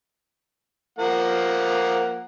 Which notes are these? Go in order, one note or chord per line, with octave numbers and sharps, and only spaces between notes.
F3 A#3 F#5